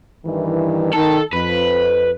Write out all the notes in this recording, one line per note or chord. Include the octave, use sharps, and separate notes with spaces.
G2 D#3 E3
D#3 A4
F2 B4